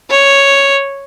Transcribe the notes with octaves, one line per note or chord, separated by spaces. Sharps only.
C#5